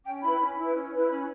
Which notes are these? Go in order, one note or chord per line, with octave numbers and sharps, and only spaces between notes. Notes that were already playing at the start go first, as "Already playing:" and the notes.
C#4 G5
E4 B4 B5
C#4
E4 B4
C#4
E4 B4
C#4 B5